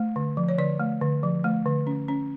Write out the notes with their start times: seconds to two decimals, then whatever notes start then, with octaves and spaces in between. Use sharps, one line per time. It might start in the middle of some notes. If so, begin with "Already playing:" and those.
Already playing: A3
0.16 D3
0.37 F3
0.48 C#5
0.58 D3 D5
0.80 A3
1.01 D3
1.23 F3
1.44 A3
1.66 D3
1.87 C#4
2.08 C#4